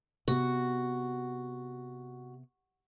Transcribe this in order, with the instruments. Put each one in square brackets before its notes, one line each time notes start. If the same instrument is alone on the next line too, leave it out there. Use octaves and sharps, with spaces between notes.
[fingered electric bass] C3 B3 [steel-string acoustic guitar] F#4